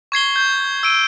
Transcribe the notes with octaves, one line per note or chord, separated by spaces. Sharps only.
C#6 G#6 C7 G7
G6
E6 D7 D#7